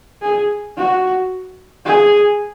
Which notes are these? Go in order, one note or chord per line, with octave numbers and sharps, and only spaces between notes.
G#4
F#4
G#4